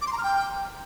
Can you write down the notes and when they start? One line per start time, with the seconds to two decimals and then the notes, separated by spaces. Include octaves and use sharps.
0.02 D6
0.07 C6
0.12 A#5
0.18 F6
0.23 G5